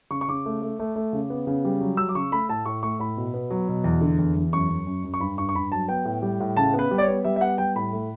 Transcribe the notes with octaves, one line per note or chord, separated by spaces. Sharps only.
C#3 C#6
C#6
C#3 D6
A3
A3
A3
A3
C#3
B3
C#3
G3
F#3
F#3 E6
D6
C#3 C#6
A3 B5
A2 A5
A2 C#6
A3 C#6
A2 B5
B2
B3
F#3
B2
E2
D3
E2
E2
F#2 C#6
F#2
F#2
F#2
C#6
G2 B5
G2 C#6
C#6
G2 B5
F#3 A5
B3 G5
A2
G3
A2
C#3 A5
B3
B4
G3
D5
C#5
B3
G3 E5
E5
B3 F#5
G3 G5
A2 B5
A3